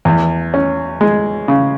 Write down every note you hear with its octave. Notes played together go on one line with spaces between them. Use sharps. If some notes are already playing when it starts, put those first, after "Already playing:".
E2
C#4
G#3
C#3